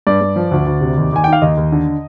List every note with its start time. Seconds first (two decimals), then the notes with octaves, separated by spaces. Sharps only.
0.07 G2 D5
0.21 G2
0.36 F3
0.51 D2
0.66 D2
0.81 C3
0.97 D#2
1.12 D#2 G#5
1.24 D#3 G5
1.33 F5
1.42 D#2 D#5
1.57 D#2
1.72 D3